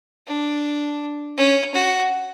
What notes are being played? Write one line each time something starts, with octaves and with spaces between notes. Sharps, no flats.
D4
C#4
F#4